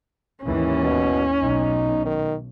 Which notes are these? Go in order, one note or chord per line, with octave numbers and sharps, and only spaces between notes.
G#1 D#2 E3 C#4
B2
B1 D#4
D#3